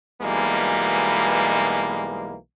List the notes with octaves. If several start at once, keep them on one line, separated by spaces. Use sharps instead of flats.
B1 B2 E3 G3 G#3 A#3